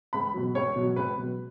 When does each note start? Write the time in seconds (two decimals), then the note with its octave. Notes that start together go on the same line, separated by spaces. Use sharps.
0.13 C#2 B5
0.34 B2 F#3
0.55 C#2 C#5
0.76 B2 F#3
0.96 C#2 B4
1.18 B2 F#3